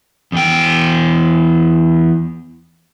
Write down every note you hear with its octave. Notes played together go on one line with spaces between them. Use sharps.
E2 G5